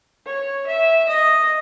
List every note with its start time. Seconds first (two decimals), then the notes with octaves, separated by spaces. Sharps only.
0.26 C#5
0.67 E5
1.08 D#5